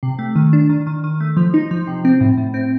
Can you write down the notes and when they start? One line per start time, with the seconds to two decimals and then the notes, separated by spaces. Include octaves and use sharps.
0.03 C3
0.19 A3
0.36 D#3
0.53 D4
0.69 D#3
0.87 D#3
1.04 D#3
1.20 A3
1.37 F3
1.54 D#4
1.71 F3
1.87 C3
2.05 C4
2.21 A2
2.38 A2
2.54 C4